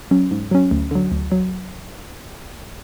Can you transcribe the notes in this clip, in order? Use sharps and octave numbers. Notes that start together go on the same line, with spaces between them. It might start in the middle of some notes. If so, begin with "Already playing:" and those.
F#3 C#4
G#2
F#3 C#4
D2
D3 F#3
D2
F#3